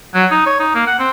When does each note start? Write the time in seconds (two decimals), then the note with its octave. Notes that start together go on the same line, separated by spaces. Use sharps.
0.14 F#3
0.31 D#4
0.46 C#5
0.59 D#4
0.75 A#3
0.87 F#5
0.99 C4